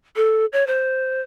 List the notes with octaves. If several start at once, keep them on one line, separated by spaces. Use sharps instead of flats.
A4
C#5
C5